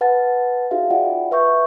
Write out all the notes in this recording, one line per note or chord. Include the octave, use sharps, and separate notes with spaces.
B4 F#5 A5 A6
D#4 E4 F#4 G#4 E5 F5
F4 D5 E5 F#5 G5
B4 E5 C#6 G6